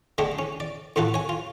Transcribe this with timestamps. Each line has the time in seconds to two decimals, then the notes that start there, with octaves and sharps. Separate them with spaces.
0.18 D3 G#3 A3 D4 G4
0.39 C#4
0.60 D5
0.96 A2 A3 F4 F#4 A4
1.14 C#5 G#5
1.29 F4